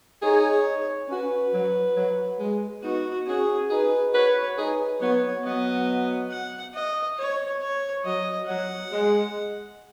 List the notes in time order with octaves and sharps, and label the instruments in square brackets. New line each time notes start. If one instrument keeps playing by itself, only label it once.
[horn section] D#4 G#4 [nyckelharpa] C#5
[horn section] C#4 F#4 [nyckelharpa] B4
[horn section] F#3
F#3
G#3
[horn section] B3 D#4 [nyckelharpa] F#4
[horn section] C#4 F#4 [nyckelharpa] G#4
[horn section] D#4 G#4 [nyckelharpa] B4
[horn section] F#4 B4 [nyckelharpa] C#5
[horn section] D#4 G#4 [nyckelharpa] B4
[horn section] F#3 B3 [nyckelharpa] C#5
[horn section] F#3 B3 [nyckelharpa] D#5
[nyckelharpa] F#5
D#5
C#5
C#5
[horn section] F#3 [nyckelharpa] D#5
[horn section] F#3 [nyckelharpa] F#5
[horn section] G#3